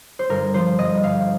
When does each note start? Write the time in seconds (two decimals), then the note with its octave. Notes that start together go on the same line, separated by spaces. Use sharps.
0.19 C5
0.29 G1 A#4
0.54 F3 C5
0.78 G1 D#5
1.03 G1 F5